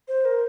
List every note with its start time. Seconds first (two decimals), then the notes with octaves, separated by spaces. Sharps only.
0.08 C5
0.25 A#4